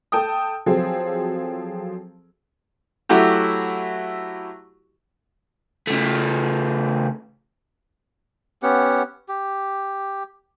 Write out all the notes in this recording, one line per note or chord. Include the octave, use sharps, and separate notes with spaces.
A4 G5 A5 D#6
F3 F#3 C4 G#4 A4
F#3 A3 E4 F#4 G4
C#3 A3
B3 C#4 G4 F#5
G4